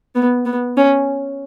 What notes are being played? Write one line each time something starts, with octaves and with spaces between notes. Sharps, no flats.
B3
B3
C#4